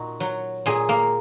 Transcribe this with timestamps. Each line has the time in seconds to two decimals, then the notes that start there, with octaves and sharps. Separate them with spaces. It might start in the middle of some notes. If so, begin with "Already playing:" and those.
Already playing: A#2 D#4 F#4
0.20 F#3
0.66 A#2 G#4
0.89 A#3